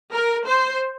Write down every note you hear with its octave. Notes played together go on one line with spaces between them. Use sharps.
A#4
C5